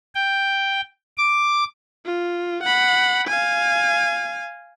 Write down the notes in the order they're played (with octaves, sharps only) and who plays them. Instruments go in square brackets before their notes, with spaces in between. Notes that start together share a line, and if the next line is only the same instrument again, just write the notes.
[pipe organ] G5
D6
[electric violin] F4
F#5 B5
F5 G#5